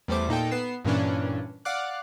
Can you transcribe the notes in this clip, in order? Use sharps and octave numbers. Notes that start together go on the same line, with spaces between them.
E2 G3 A3 C5 D6
A#2 D#4 A4 G5
B3 C7 E7
G2 A#2 E3 C#4 D4
D5 F5 F#5 D6 F#6